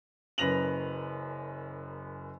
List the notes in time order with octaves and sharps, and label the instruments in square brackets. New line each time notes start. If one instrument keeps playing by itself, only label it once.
[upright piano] F#1 F#2 B4 A#6 F7 F#7